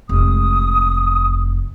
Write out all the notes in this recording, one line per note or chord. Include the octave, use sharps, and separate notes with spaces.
F1 G#3 D#6